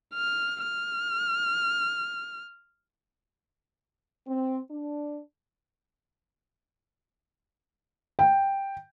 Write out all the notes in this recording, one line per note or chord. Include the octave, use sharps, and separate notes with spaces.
F6
F6
C4
D4
G5